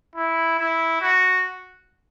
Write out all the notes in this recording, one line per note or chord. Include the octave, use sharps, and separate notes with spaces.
E4
E4
F#4